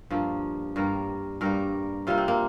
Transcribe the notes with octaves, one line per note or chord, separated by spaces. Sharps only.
G2 F3 A#3
G2 G3 A#3 A#4
G2 G3 A#3 A#4
C3 G3 A#3 F4
C4
A#3